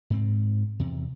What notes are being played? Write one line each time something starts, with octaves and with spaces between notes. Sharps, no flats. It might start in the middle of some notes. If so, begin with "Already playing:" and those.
G#2 C4
E2 C3